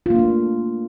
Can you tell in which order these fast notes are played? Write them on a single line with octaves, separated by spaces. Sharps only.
F4 A#3 D4 A3